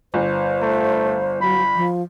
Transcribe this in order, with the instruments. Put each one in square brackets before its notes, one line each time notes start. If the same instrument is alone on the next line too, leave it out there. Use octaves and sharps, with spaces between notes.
[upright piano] G1 [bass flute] C5
[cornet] A3
[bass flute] F#3 [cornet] B5
[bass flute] F3